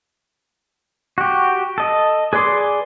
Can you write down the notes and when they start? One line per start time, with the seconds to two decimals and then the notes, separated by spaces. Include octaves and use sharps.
1.18 F#4 G4
1.78 A4 D#5
2.33 G#4 B4 D5 C6 D6